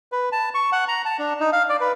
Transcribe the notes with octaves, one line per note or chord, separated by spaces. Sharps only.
B4
A5
C#6
F#5
A#5
A5
D4
D#4
F5
D5
B4